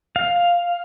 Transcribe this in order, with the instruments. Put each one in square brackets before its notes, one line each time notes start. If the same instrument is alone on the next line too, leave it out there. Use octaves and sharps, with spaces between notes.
[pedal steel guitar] F5